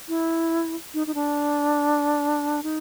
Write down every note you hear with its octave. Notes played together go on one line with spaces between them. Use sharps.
E4
D#4
D#4
D4
D#4